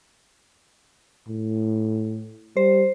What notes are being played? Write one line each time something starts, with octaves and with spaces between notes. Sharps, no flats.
A2
G3 C5